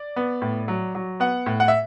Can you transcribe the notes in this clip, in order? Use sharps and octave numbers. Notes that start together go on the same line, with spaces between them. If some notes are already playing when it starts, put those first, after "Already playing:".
Already playing: D5
B3
A2
F#3
F#3
B3 F#5
A2
F#5
E5